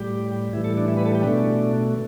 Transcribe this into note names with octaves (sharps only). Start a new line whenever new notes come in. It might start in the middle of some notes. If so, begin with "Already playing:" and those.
Already playing: A2 G3 G4
A2 E3 G3 E4
A4
D4
E4
B4
A4
G4
B2 A3 D4